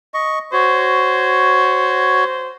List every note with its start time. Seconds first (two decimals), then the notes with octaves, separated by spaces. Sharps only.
0.14 D#5 C#6
0.53 F#4 C5 C#5